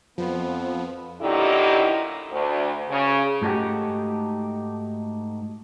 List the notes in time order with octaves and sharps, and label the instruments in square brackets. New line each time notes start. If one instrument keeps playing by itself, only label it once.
[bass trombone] F2 [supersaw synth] F3 [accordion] B3
[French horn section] F#2 A#2 D3 D#4 E4 G4
D2
C#3
[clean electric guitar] G#2 A3 D#4 F#4 G4